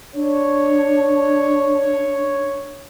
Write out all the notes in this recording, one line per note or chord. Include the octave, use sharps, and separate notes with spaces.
D4 C#5